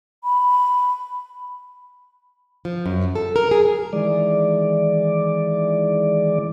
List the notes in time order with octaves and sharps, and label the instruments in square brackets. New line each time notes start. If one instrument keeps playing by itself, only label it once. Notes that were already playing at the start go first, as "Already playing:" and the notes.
[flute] B5
[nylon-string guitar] F3
F#2
A4
A#4
G#4
[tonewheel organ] D#3 E3 G#3 D5